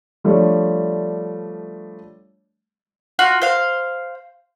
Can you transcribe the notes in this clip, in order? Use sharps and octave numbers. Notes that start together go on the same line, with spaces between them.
F3 G3 A3 D4 C#5 D5
F4 F#4 F#5
C5 F5